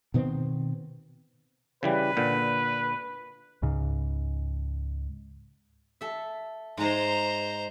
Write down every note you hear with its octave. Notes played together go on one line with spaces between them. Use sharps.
B2 D#3 B3 C4
C#3 E3 G3 B4
A#2 D3
C#2 G#2 C#3
A4 E5
G#2 G#3 C5 A#5